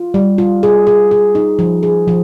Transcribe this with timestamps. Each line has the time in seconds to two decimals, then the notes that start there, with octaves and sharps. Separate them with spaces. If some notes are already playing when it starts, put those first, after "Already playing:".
Already playing: F4
0.14 G3
0.38 F4
0.63 G#4
0.87 G#4
1.11 G#4
1.35 D#4
1.59 F3
1.83 G#4
2.08 F3